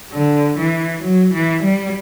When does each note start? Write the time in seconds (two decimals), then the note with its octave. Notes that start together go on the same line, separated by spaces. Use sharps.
0.12 D3
0.58 E3
1.04 F#3
1.34 E3
1.63 G3